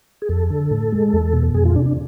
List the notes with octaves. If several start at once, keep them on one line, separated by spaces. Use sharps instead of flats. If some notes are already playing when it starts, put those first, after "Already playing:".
G#4
F2 A4
D3
A2
G#3
E2
B2
F2 G#4
F4
C3 D4
D4